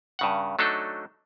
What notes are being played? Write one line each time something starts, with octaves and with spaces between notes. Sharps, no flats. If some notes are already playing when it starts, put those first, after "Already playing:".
G2 C#3 F#5
F#3 A3 D4 D#4 A4